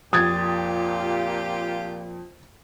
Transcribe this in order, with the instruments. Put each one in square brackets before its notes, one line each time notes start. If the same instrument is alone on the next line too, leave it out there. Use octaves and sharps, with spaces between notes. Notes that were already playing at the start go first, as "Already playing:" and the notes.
[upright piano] F2 [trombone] A#2 [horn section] F4 G4 [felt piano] D#6 G#6 A6